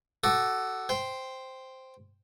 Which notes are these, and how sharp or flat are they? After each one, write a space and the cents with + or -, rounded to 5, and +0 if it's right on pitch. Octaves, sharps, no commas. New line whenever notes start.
F#4 +15 A4 +0 D6 +35
C5 +0 G5 +0